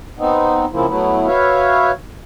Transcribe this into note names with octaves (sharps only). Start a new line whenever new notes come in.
B3 C4 D#4
C#3 F3 A#3 C4 E4
F#3 A3 B3 E4
F#4 B4 C#5 E5 F5